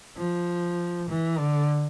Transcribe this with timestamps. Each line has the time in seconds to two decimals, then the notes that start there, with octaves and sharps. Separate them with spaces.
0.17 F3
1.09 E3
1.39 D3